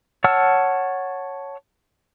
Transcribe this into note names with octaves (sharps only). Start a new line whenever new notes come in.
C#5 F#5 A5 E6 F6